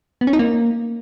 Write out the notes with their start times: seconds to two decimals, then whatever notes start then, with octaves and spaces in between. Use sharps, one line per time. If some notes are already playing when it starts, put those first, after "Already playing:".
0.21 B3
0.27 C#4
0.33 D#4
0.39 A#3